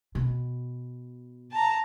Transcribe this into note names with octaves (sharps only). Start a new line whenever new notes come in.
B2
A5 A#5